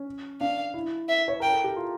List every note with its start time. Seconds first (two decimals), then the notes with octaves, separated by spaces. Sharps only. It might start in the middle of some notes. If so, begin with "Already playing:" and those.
Already playing: C#4
0.41 D4 F5
0.74 E4
1.09 E5
1.28 C#5
1.40 A#4 G5
1.52 A4
1.64 G4
1.76 F4